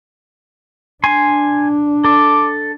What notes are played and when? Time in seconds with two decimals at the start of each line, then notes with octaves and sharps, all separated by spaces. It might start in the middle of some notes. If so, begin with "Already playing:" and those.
1.04 D4 G#5 C6
2.04 A4 D6